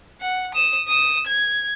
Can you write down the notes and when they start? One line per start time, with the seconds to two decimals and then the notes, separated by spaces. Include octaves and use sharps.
0.21 F#5
0.55 D#6 E7
0.87 D#6 E7
1.27 G#6